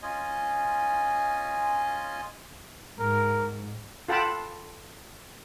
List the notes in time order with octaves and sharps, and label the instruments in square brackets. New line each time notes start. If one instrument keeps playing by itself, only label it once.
[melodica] C#4 F4 D#5 G#5
[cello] G#2 [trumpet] A#4
[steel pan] F4 A4 F#5 G5 A5 B5